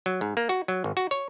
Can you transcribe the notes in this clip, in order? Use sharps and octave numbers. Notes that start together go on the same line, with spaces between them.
F#3
G#2
A#3
F#4
F#3
G#1
F#4
C#5